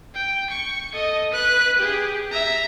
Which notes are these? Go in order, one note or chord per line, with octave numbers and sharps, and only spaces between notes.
G5
C#6
A4 D#5
B4 F#6
G4 G#4
E5 A#5